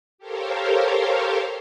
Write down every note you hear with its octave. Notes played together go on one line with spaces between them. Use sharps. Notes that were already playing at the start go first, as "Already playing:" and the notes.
G4 A4 A#4 C5 C#5 F5